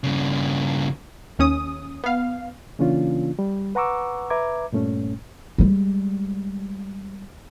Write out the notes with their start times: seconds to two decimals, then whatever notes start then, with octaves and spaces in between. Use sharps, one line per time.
0.04 G2 C#3
1.39 D#2 C#4 D#6
2.04 B3 F5
2.79 C#3 E3 A#3 C#4 D4 F4
3.39 G3
3.75 B4 F#5 A#5 C#6 D6 E6
4.30 B4 E5 A#5 D6 G#6
4.72 G2 A#2 A3 C#4
5.58 G3 G#3